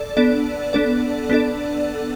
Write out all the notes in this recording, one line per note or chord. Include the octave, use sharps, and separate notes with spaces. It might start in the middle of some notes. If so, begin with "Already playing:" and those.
Already playing: A4 D5
B3 D4 A4 D5
B3 D4 A4 D5
B3 D4 A4 D5